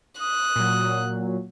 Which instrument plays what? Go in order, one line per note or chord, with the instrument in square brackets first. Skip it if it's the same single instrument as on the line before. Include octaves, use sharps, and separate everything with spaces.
[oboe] D#6 [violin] F#6
[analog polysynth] A#2 F#3